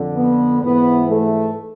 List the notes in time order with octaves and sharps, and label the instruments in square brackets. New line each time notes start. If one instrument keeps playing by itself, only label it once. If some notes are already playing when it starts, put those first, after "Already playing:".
Already playing: [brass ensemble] F2 D3
B3
G#2 E3 B3
A3